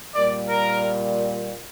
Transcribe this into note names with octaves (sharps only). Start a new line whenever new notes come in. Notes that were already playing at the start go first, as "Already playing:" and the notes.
A#2 G3 A#3 D5
A#4